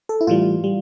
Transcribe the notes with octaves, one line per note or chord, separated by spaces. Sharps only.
A4
E4
A2 E3 G3 F4
G3